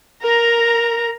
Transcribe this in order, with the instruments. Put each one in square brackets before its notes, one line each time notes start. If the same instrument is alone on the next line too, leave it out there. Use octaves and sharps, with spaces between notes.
[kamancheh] A#4 A#5